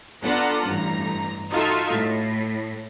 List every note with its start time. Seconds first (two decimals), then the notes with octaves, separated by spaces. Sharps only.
0.22 B3 D4 F4 A4 F#5 A#5
0.66 A1 G2 A#5
1.50 D#4 F4 F#4 A4 E5
1.90 A2